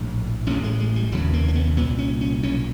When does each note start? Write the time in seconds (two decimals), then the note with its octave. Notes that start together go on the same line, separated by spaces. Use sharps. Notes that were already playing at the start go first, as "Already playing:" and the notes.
Already playing: A#1 A2
0.47 A1 C#4
0.50 A2
0.64 G#3
0.80 G#3
0.96 G3
1.12 F1 D#2 C#3 F#3
1.33 A#3
1.48 A#3
1.55 B3
1.77 C2 A#2 B3
1.99 C#4
2.21 C#4
2.43 B1 A#2 C#4